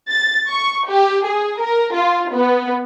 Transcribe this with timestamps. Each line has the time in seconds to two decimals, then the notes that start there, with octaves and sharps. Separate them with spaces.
0.11 A6
0.50 C#6
0.88 G4
1.26 G#4
1.60 A#4
1.94 F4
2.33 B3